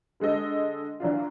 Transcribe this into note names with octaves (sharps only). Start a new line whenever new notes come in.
D3 G#3 A4 D#5
E3 F#3 D4 F4